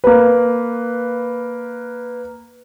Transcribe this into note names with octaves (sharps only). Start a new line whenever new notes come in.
A#3 B4